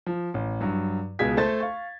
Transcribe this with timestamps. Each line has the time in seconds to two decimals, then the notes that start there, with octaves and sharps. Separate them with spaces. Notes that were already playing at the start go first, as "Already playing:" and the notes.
0.06 F3
0.34 A1
0.61 G2 F#3
1.19 C#2 B2 G#4 G#6 B6
1.37 A3 A4 C5 A5 A6
1.60 F5 C#6